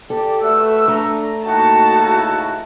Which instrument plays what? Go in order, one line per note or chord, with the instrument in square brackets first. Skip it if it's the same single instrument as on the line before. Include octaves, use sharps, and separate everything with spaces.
[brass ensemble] G4 D5 [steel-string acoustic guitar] A4
[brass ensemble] A3 [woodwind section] F#4 B4 E6
[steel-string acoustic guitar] A3 [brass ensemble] D4 A#5
[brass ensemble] A2 D#3 [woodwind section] A#3 D#4 F#4 [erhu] A5
[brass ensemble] C#2 E4